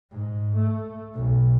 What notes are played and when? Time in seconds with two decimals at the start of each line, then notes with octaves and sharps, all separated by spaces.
0.12 G#2
0.57 A3
1.15 B1